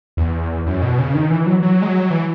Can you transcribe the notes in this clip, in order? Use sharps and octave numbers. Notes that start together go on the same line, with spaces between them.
E2
F#2
B2
C#3
D#3
E3
F#3
F#3
G#3
F#3
E3